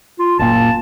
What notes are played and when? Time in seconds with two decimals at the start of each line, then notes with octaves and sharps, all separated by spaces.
0.19 F4
0.39 F#1 A#2 A5